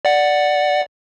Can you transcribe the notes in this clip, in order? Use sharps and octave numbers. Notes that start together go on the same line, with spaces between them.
D5 F#5